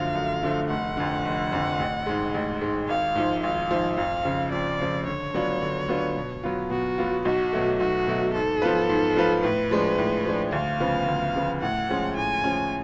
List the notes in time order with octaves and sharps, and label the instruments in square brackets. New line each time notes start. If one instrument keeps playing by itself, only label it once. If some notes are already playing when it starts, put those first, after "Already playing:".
Already playing: [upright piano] F#2 D3 F3 A3 [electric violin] F5
[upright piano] F#2
D3 F3 A3
[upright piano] F1 [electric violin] F#5
[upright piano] F2 D3
F1
F2 D3
A1
G#2 G#3
A1
G#2 G#3
[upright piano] G#1 [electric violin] F5
[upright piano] G#2 F3
[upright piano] G#1 [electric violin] F5
[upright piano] G#2 F3
[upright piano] F2 [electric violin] F5
[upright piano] C#3 F3
[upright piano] F2 [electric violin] D5
[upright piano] C#3 F3
[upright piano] D3 [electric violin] C#5
[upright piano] F#3 B3 D4 F4
D3
F#3 B3 D4 F4
B2
F#3 B3 F4
[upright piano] B2 [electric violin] F#4
[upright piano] F#3 B3 F4
[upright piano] B1 [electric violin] F#4
[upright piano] B2 F#3 A3
[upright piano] B1 [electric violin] F#4
[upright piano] B2 F#3 A3
[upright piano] G#2 [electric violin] A4
[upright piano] F3 B3 F4 B4
G#2
F3 B3 F4 B4
[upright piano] A2 [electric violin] B4
[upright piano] F3 G#3 D4
A2
F3 G#3 D4
[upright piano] D2 [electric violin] F5
[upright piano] C#3 F3 B3
D2
C#3 F3 B3
[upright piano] A2 [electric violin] F#5
[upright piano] F3 G#3 C#4
[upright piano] A2 [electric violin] G#5
[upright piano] F3 G#3 C#4